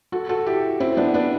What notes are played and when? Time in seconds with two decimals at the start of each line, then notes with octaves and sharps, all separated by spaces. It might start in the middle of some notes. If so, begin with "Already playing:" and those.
0.12 F#4 A4
0.29 F#4 A4
0.46 E4 G4
0.80 C4 E4
0.97 B3 D4
1.14 B3 D4